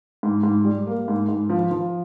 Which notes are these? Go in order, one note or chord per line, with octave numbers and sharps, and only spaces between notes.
G#2
G#2
G3
A#3
G#2
G#2
F3
F3